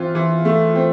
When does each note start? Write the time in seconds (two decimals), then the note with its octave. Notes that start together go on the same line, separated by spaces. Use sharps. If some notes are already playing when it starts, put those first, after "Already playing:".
Already playing: E3 C4 F4
0.15 E3
0.45 A3
0.75 C4